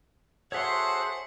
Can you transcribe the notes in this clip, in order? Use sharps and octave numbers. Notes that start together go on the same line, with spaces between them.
F#4 G#4 A4 C5 C#5 E5 F#5 C6